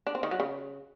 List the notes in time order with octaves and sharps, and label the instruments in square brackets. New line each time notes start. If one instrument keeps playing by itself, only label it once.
[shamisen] D4
C4
D#3
F#3
C#3